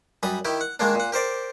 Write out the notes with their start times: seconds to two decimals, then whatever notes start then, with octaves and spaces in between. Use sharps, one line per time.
0.23 F#2 G3 B5 D#6
0.45 D#3 E4 G4
0.61 F#5
0.80 D#3 G#3 A#3 D4
0.95 A#2 F#5
1.12 G4 A#4 C5 D5